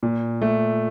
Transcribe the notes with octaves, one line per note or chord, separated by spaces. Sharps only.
A#2
A3